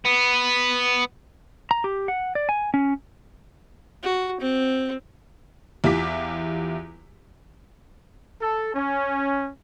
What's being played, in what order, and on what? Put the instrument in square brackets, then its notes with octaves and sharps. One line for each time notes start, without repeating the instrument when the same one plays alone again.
[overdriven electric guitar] B3
[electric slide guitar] A#5
G4
F#5
D5
G#5
C#4
[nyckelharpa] F#4
C4
[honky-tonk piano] E2 E4 F4 G4 D6 B6
[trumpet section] A4
C#4